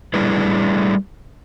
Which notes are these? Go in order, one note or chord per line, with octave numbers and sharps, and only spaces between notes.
G3 A3 D4 E4 G#4 B4